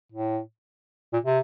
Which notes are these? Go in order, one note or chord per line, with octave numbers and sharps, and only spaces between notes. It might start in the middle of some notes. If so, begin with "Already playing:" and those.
A2
A#2
C3